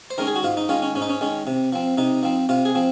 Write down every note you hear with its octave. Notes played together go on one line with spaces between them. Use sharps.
C5
D#3 G#3 C#4 A#4
G#4
F#4
G#2 F4
D#4
D#3 G#3 C#4 F4
C#4
G#2 C#4
D#4
C#4
D#3 G#3 C#4
C3
F3 C4
C3 D#4
F3 C4
C3 F4
G#4
F3 C4